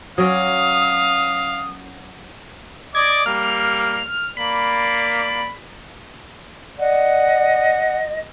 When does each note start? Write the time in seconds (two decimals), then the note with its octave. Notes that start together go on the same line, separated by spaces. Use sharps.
0.18 F#3 C#4 D5 F5 D#6
2.95 D5 D#5 D6 G#6
3.26 G3 A#3 F6
4.37 A#3 D5 B5
6.79 D5 D#5 F#5